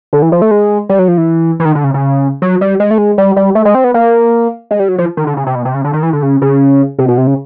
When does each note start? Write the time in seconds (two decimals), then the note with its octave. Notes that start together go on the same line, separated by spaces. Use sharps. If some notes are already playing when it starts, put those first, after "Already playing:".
0.13 D3
0.22 E3
0.32 F3
0.42 A3
0.51 G#3
0.89 G3
0.99 F#3
1.08 F3
1.18 E3
1.60 E3
1.65 D#3
1.75 D3
1.84 C#3
1.94 C#3
2.42 F#3
2.61 G3
2.80 G#3
2.91 A3
2.98 G#3
3.18 G3
3.36 G3
3.55 A3
3.65 G#3
3.75 C4
3.84 B3
3.94 A#3
4.71 G#3
4.80 G3
4.89 F#3
4.98 F3
5.17 D#3
5.27 D3
5.37 C#3
5.47 C3
5.55 B2
5.65 C3
5.74 C#3
5.84 D3
5.93 D#3
6.03 E3
6.13 D3
6.23 C#3
6.42 C#3
6.99 C3
7.08 B2
7.18 C3
7.27 C#3